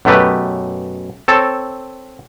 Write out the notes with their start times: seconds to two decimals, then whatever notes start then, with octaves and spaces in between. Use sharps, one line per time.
0.05 F#2 B2 A3 G4 B4
1.28 C4 A4 C#5 A5